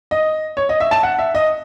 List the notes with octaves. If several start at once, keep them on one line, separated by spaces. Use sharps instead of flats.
D#5
C#5
D#5
E5
A5
F#5
E5
D#5